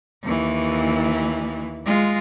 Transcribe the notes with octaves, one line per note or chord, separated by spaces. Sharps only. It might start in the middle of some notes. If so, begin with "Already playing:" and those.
D#2 E3
G#3 F4